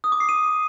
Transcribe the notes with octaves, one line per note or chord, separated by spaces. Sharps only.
D#6
D6
C7
D#7